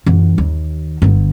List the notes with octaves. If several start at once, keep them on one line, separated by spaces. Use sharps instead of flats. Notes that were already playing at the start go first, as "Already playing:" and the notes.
F#2 E3
D#2
G1 D3